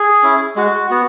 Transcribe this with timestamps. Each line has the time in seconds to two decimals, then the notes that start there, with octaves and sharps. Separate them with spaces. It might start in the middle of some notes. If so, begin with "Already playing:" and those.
Already playing: G#4
0.23 C#4 E4
0.56 G#3 F#4
0.90 B3 F#4